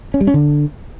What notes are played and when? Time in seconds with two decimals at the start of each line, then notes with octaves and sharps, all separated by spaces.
0.14 C#4
0.21 G3
0.27 C#4
0.34 D3